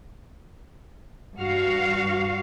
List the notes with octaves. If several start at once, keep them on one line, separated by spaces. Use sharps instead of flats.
G2 F#4 F5